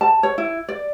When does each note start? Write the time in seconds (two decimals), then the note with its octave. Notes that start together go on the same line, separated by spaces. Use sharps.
0.01 A5
0.23 C#5
0.38 E4
0.69 D5